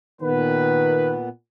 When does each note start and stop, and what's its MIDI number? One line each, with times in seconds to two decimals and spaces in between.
0.22 1.29 46
0.22 1.14 51
0.22 1.29 59
0.22 1.14 71